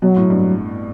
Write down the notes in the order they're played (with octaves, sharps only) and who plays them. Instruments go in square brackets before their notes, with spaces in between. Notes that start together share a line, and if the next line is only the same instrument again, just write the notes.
[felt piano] B2 [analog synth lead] F#3
[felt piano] A2
G2